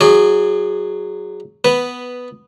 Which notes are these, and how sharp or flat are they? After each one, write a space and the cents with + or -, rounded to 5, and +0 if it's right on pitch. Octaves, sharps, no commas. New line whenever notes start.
F#3 +0 G#4 +0 D5 +40
B3 +5 B4 +0